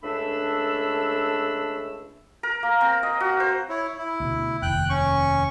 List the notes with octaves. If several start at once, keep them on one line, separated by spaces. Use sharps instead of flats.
C#2 A3 D4 B5 E6
A#4
A#3
C4
D#5
F#4
C5
E4 C#5
E4
D2 B2
F1 D#2 G5 F#6
C#4 C#6